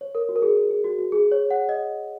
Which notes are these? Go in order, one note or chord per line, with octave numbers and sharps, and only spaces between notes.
C#5
A#4
F#4
A#4
G#4
A#4
G#4
F#4
F#4
G#4
C#5
F#5
D#5